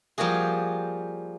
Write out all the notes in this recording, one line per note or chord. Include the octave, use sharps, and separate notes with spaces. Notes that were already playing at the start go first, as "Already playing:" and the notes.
F3 G3 A#3 F#4 G#4